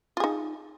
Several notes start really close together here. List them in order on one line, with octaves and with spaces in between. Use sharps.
F4 G#4 D#4